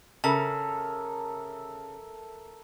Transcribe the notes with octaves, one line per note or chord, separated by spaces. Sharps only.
C#3 A4 A#4 E5 A5